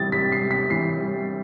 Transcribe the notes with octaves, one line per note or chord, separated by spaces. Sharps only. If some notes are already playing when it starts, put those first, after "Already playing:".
Already playing: C3 E3 G3 A6
C3 B6
C7
C3
B6
E3 C7
G3